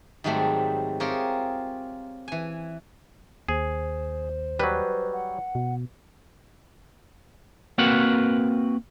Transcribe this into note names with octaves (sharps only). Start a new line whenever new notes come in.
G#2 D#3 F#3 G3 A3 C4
C4 F4 G4 G#4 A#4 C#5
E3 G#5
D#2 G#4 C5
F#3 G3 B4
F#5
B2
A#3 C4 F#4 A#4 B4 F#5